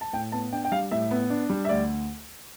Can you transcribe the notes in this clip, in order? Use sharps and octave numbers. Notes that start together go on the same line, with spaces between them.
A5
A2 G5
B3 A5
D4 G5
G5
G3 F5
A2 E5
B3
D4
G3
E5
D2 D5